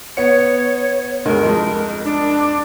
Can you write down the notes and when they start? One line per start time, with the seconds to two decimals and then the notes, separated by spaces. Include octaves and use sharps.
0.17 B3 C#5 C#7
1.25 D2 G2 G#3 A#4
1.43 C2 F2 G#3
2.05 D4
2.39 D6